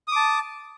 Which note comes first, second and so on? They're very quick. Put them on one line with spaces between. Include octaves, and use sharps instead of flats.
D#6 D6 A5